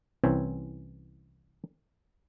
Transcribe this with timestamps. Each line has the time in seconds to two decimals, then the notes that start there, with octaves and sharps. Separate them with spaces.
0.24 C2 E3 C4 C#4 C5 G#5